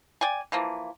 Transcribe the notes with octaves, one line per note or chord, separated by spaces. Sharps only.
D5 G5 G#5
E3 F3 A#3